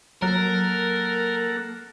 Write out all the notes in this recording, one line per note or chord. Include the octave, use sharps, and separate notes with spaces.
F#3 A#3 A4 A#4 F#5